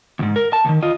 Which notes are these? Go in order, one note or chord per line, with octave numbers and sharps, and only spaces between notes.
D2 G#2
A#4
A5
D2 D#3
F4 D#5